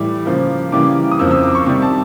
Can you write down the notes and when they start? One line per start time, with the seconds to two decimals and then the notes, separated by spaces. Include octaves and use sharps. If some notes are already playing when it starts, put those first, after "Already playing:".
Already playing: A2 E3 G3 D6
0.26 C#3 F3 A#3
0.72 C#3 E3 G3 A#3 D6
1.11 D#6
1.19 F2 C#3 F3 A#3 E6
1.31 E6
1.43 D6
1.55 C#6
1.66 C3 D#3 G3
1.82 A5